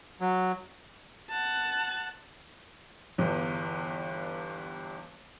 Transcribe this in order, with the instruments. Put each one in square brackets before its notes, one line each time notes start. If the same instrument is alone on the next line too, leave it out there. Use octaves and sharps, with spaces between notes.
[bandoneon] F#3
[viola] F#5 A5
[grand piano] G1 E2 G2